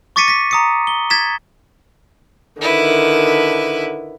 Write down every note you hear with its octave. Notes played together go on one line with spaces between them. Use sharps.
C#6 D6 A6 B6 C#7 D#7
A#6 B6
A#5 D#6 C#7
G7
G#6 A6 B6 E7
D3 D#3 E4 B4